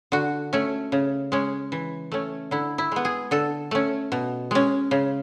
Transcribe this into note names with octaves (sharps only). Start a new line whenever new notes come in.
D3 F#4
A3 C#4
C#3
G#3 C#4
E3
A3 C#4
D3 E4
E4
G#3 B3
G#4
D3 A4
A3 C#4
B2
G#3 C#4
C#3